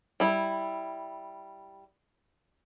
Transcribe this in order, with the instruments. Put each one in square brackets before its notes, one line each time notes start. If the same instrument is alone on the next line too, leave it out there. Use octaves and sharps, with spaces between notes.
[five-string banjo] G3 E4